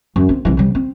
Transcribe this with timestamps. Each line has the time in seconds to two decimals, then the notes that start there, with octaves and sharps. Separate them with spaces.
0.16 F#2
0.29 C4
0.45 C2 E3
0.57 C3 G3
0.75 C4